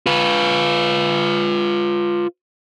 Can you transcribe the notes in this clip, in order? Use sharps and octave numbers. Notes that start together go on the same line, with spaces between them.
F4 B4